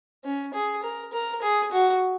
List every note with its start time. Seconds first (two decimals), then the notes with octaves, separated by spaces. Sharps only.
0.24 C#4
0.54 G#4
0.83 A#4
1.13 A#4
1.42 G#4
1.72 F#4